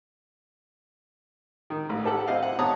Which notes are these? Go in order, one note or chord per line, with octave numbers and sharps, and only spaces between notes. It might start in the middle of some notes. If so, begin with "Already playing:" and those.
D#3
A1
G4 A4 F#5
C4 E4 C5 D#5 F5
F#5
B3 C#5 A5 A#5 D#6